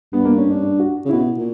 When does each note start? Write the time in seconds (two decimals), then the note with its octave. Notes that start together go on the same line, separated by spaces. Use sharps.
0.13 G2 B3
0.25 A#3
0.38 C#4
0.50 D4
0.63 D4
0.80 F#4
1.05 C#3
1.09 E4
1.12 B2 F#4
1.38 A#2